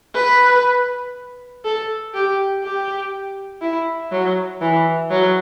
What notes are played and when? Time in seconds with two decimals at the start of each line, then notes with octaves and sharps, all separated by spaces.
0.15 B4
1.64 A4
2.14 G4
2.63 G4
3.61 E4
4.12 F#3
4.61 E3
5.10 F#3